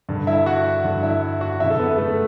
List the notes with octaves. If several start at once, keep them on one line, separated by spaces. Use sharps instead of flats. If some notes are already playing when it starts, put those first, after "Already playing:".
G2 D3
E4 E5
F#4 F#5
G2 D3
E4 E5
F#4 F#5
F#2 D3 E4 E5
A4
B3 B4
A3 A4